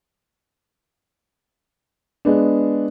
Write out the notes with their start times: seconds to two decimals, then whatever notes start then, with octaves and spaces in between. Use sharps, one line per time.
2.25 G#3 B3 D4